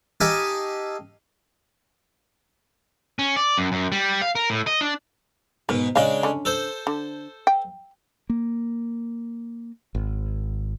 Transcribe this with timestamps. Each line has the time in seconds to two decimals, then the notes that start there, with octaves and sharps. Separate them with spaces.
0.21 D#4 G4 A4 F5 G#5
3.19 C#4
3.36 D5
3.58 F#2
3.72 F#2
3.92 G3
4.22 F5
4.35 A#4
4.50 A2
4.67 D#5
4.81 D4
5.69 G#2 B2 A#4
5.96 C#3 G#3 D4 D#5 F5
6.23 D3 C#4
6.45 A4 C5
6.87 D3
7.47 G5
8.30 A#3
9.95 G#1